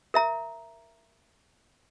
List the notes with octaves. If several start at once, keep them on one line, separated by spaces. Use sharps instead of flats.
A#4 E5 A#5